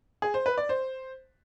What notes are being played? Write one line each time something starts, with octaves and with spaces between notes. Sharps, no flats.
G#4
C5
B4
D5
C5